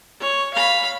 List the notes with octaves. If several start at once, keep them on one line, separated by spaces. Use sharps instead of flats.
C#5
F5 B5